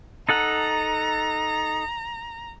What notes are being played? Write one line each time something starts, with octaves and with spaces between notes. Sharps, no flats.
D#4 A4 F#5 A#5